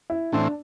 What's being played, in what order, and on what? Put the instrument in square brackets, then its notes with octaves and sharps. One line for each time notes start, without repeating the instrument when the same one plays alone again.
[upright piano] E4
[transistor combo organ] A2 E3 C4 [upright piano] D4